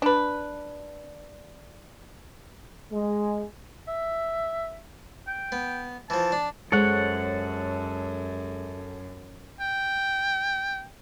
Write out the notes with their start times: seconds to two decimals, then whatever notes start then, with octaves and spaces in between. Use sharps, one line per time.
0.02 D4 B4
2.92 G#3
3.88 E5
5.27 G5
5.52 B3
6.10 E3 F3 A5
6.32 D4
6.72 F#2 G#3 A4 C5 C#5 F#5
9.60 G5